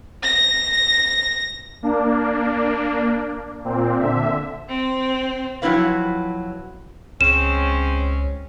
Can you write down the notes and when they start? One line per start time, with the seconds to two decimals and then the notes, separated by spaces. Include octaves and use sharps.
0.23 A#6
1.83 A#3 D4
3.64 A#2 C4
4.00 D3 E5
4.67 C4
5.62 F3 F#3 C4 E4 B4 F5
7.21 C#2 G#3 C4 C#4 E7